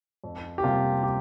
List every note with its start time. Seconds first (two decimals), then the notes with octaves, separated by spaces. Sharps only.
0.24 F2
0.58 G4
0.63 C3 G3 A#3 F4
1.03 G4